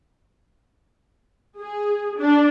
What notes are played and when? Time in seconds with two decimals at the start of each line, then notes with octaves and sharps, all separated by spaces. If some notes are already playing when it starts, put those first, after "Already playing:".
1.60 G#4
2.19 D4